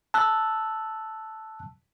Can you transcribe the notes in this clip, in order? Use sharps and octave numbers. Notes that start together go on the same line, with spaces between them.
A5 E6 F#6